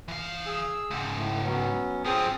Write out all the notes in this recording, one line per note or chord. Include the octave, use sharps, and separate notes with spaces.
E3 F5
G#4 E6
C#2 G#2
A2 A3
F#3 B3 C#4
G2 F3 C4 G#4 D#6